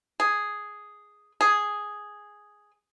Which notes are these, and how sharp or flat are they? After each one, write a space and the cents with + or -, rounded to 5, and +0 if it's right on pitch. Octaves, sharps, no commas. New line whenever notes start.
G#4 +0
G#4 +0